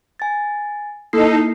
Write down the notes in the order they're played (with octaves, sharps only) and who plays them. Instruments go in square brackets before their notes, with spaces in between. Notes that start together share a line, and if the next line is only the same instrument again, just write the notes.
[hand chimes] G#5 A6
[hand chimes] A#3 E4 C7 [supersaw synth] D#4 A4